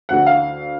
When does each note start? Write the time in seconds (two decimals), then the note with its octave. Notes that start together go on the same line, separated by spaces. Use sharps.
0.09 D2 D3 F#5
0.26 F5